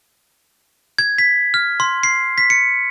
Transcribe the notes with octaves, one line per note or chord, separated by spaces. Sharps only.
G#6
B6
F6
C6
C7
B6
C#7